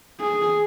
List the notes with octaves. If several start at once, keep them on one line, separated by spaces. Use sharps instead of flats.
G#4